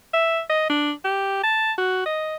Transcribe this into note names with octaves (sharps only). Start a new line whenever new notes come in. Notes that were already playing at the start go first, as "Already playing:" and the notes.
E5
D#5
D4
G4
A5
F#4
D#5